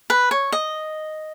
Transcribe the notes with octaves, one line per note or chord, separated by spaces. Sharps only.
B4
C#5
D#5